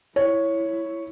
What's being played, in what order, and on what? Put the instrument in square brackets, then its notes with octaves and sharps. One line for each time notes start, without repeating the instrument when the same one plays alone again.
[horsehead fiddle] E4 [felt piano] C#5